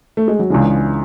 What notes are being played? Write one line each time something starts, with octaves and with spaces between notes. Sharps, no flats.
A3
G#3
F#3
C#2 C#3 E3 G#3 D4